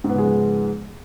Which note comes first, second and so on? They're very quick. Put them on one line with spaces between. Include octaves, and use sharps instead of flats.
G#2 B3 C#3 G#3 F3